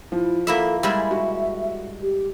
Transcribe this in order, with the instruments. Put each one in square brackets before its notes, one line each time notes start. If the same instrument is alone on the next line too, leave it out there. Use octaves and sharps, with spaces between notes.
[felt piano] F3 [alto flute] E4
[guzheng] A#3 E4 E5 [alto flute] A4
[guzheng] G3 G#3 E4 [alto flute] E5
[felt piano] F#4
[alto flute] G4